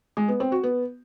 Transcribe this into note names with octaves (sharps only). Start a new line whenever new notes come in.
G#3
B3
C4
F#4
B3